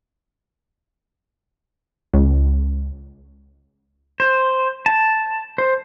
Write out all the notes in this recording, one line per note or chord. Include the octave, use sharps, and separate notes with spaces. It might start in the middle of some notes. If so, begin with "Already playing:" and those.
C#2
C5
A5
C5